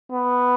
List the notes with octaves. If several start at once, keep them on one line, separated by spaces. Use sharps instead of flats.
B3